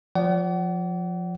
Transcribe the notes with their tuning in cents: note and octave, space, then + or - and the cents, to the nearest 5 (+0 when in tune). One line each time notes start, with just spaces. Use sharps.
F3 +15 D5 -30 F#5 +35